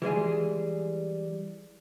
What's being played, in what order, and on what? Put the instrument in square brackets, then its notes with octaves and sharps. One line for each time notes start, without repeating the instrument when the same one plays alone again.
[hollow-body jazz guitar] E3 G3 G#3 G#4